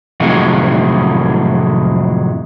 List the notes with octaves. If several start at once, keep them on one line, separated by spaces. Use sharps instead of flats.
F2 A2 C3 D#3 F#3 G#3